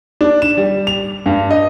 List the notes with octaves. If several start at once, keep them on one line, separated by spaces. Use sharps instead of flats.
D4
E7
G3
F7
G2
D#5